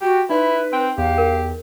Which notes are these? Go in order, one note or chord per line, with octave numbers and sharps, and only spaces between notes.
F#4 G4
D#4 E4 B4 D5 C6
C4 G5
E2 G4 F5
A#4